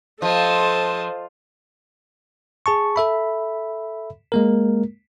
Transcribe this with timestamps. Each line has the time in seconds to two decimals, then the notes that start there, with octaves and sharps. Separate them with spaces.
0.22 F3 A4 C5 D#5 A5
2.66 G#4 A5 C#6
2.96 A4 E5 B5
4.32 G#3 A#3 A#4